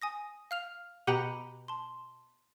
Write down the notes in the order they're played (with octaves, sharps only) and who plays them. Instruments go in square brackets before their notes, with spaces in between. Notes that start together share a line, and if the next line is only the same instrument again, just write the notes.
[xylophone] G#5 D#6 A#6
F5 F6 F7
[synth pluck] B2 G4 F#5 [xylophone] A#5 B5 D#7
[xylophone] A5 C6